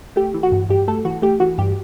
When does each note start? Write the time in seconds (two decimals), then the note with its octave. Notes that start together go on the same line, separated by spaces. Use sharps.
0.16 A3 G4
0.34 E3
0.43 F#4
0.52 G2
0.69 G2 G4
0.88 A3 A4
1.05 E3 F#4
1.22 A3 G4
1.40 E3 F#4
1.58 G2 G4